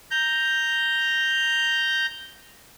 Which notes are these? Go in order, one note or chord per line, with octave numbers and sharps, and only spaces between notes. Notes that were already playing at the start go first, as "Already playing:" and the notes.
A#5 G6